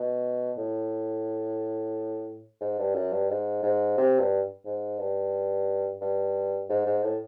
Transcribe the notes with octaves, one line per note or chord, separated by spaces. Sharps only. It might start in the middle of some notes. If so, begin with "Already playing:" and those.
Already playing: B2
A2
G#2
G2
F#2
G2
G#2
G#2
C3
G2
G#2
G2
G2
G#2
G#2
A2